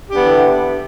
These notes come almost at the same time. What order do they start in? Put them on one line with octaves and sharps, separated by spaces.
G4 D4 B3 E3 D3